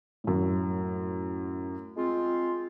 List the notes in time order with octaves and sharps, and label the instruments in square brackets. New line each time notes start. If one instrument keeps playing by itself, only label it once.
[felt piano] F#2 A2
[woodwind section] G#3 C4 F4